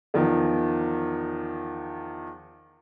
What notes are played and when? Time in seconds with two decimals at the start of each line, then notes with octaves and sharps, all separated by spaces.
0.14 E2 D#3 F3